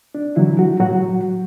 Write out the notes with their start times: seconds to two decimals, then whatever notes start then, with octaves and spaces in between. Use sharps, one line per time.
0.15 D4
0.36 D3 E3 F#3 E4
0.59 F#3 F#4
0.80 A2 F#3 F#4